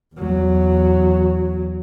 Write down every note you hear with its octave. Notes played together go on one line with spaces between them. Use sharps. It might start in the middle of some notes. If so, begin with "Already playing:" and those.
E2 F#3